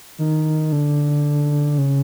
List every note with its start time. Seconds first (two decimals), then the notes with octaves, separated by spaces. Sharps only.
0.19 D#3
0.72 D3
1.78 C#3